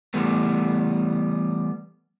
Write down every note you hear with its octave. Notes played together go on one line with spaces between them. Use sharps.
E3 G3 A3 B3